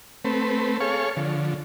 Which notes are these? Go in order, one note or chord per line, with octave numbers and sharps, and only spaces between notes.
A3 C4 B4
G#4 A4 C#5 F5 C#6
D3 F3